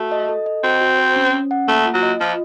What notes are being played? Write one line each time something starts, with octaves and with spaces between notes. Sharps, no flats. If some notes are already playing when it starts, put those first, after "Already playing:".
Already playing: A3 F#4
D#5
A4
D#5
C4 F#4
F#4
C5
C#4
C#4
F#5
A3 A#3
F4
F#3
D#5
F3 F4